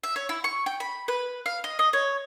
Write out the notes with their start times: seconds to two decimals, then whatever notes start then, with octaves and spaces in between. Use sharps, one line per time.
0.03 E5
0.16 C#5
0.29 E4
0.44 C#6
0.66 G5
0.80 B5
1.08 B4
1.46 F5
1.64 D#5
1.79 D#5
1.93 C#5